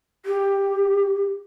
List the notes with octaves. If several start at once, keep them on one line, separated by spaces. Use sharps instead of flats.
G4